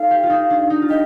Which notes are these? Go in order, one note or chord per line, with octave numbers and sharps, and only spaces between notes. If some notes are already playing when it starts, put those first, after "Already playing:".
Already playing: D#4 A4 F5
G4
F4
D#4
D4
D#4
F4
G4 D#5